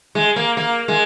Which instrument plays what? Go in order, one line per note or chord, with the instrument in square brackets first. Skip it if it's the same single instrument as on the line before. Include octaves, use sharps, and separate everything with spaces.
[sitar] G#3
A#3
A#3
G#3